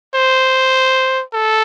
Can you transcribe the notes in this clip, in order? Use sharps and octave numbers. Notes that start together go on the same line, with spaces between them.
C5
A4